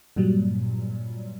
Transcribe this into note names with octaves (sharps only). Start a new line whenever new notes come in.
G2 A#2 F#3 G3